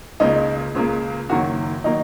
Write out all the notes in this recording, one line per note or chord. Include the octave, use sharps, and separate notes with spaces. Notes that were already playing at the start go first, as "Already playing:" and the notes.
C#2 C#3 A#3 D#4
C#2 C#3 A#3
F#1 F#2 D#3 F#3 A#3 F#4
D#3 F#3 A#3 D#4